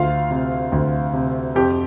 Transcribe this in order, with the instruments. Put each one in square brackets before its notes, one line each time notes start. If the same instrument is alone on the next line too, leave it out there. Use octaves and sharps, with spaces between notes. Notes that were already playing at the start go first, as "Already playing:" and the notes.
Already playing: [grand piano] D2 F4 F5
C3
D2
C3
F2 G4 G5